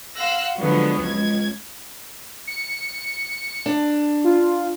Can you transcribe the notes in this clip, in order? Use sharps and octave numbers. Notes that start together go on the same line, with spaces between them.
F5 F#5 C6 E6 F#6 A#6
D3 F3 F#3 G#3 B3
C#2 G#6
C#7
D4
F4